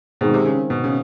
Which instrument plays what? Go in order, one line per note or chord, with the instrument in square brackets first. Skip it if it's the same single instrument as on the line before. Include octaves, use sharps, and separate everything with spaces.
[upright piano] B2 [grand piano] D#3 G#3 C4 D#4 G#4
[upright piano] C3
C#3
B2
C#3